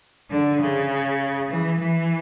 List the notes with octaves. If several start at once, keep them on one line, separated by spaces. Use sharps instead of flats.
D3
C#3
E3
E3